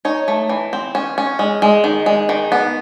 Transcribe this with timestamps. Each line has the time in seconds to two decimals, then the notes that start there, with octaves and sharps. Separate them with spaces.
0.05 D#4 C#5
0.28 A3
0.49 E3
0.73 C4
0.95 C#4
1.18 C#4
1.39 G#3
1.62 G#3
1.84 D#3
2.06 G#3
2.29 D#3
2.52 B3